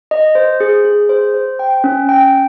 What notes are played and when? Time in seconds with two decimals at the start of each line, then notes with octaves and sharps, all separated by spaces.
0.11 D#5
0.35 C5
0.60 G#4
0.85 G#4
1.09 C5
1.34 C5
1.59 G5
1.84 C#4
2.09 G5